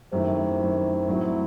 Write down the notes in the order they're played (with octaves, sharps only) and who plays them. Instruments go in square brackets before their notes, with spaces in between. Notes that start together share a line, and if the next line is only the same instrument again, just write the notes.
[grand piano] F#2 D#3 A3 E4 [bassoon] C3
[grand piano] F#2 D#3 A3 E4
A2 F#3 C4 E4